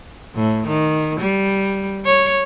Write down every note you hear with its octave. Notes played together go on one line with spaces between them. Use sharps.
A2
D#3
G3
C#5